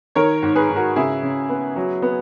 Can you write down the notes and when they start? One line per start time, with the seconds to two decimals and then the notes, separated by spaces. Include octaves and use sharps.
0.15 D#3 A#4 C#5
0.42 G#2
0.55 G#4 B4
0.69 G#2
0.76 F#4 A#4
0.96 C#3 E4 G#4
1.23 C#3
1.49 B3
1.76 F#3
2.02 B3